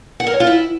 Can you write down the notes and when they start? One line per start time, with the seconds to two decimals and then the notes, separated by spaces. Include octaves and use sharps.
0.20 F#5
0.27 A#4
0.33 C#5
0.40 F4
0.47 E4